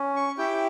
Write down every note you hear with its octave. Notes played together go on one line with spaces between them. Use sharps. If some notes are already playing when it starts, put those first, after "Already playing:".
Already playing: C#4
C#6
E4 G4 G5